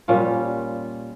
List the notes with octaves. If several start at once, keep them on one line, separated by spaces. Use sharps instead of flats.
A#2 G3 C#4 F4